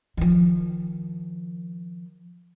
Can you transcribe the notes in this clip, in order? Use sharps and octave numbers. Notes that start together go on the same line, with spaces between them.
D#3 F3